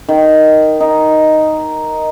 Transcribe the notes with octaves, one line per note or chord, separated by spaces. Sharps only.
D#3
D#4